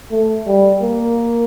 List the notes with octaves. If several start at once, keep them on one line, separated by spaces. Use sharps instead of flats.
A3
G3
A#3